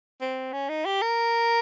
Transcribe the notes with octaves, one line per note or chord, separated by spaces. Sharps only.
C4
C#4
D#4
G4
A#4